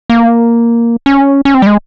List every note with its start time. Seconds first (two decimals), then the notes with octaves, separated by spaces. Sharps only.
0.10 A#3
1.06 C#4
1.45 C#4
1.54 C4
1.62 G3
1.67 G#3